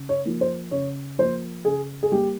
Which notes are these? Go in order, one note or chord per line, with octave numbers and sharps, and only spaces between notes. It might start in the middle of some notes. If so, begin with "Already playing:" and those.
Already playing: C#3
C#5
F3 A#3
C5
C#3 C#5
F3 A#3 C5
C#3 G#4
G#4
G3 A#3 G4